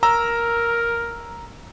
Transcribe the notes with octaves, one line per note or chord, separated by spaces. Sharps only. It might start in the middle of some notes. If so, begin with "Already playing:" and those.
A#4 A#5 E6